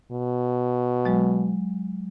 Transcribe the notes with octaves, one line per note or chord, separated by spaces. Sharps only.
B2
F#3 G#3